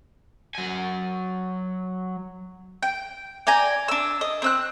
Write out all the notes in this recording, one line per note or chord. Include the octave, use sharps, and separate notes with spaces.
F#3 G#5
G5
D5 G5 G#5 A#5
D4 E6
D#5
C4 E6 F#6